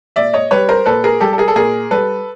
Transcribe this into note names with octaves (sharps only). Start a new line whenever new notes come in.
A#2 D5 E5
C#5 D#5
G3 B4 C#5
A#4 C5
A#2 A4 B4
G#4 A#4
G3 G4 A4
A4
G#4 A#4
A4
A#2 G#4 A#4
G3 A4 B4